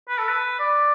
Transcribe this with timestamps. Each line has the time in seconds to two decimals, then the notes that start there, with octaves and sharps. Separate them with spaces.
0.08 B4
0.18 A4
0.29 B4
0.60 D5